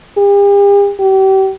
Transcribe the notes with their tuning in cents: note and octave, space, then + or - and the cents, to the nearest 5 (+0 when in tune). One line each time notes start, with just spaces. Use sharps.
G4 +45
G4 -35